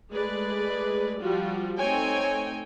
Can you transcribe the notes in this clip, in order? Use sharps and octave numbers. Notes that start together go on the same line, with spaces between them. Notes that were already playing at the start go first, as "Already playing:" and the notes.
G#3 A3 G#4 B4 D5
F3 G3 F4 F#4
A3 C4 D#4 C#5 G5 G#5